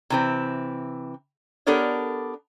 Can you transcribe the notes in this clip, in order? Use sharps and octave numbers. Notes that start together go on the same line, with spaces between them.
C3 E3 C4
B3 D4 G4 A4 A#4 C#5